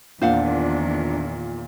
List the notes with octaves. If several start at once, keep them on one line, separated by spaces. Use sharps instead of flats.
E2 A#2 D#3 D4 C5 F5 F#5